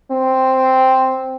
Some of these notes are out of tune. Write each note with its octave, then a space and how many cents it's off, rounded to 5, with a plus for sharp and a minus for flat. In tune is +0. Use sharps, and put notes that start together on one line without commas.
C4 +0